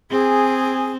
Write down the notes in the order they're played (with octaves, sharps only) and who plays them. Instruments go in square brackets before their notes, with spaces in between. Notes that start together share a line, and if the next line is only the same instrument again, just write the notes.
[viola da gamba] C4 [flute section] G#4